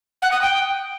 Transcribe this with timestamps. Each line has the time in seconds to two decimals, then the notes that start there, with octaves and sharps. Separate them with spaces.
0.22 F#5
0.32 D#6
0.41 G5